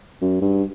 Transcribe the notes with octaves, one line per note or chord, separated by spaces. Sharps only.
F#2
G2